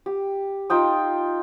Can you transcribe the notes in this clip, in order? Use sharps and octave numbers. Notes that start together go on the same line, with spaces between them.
G4
D#4 F4 G5 D#6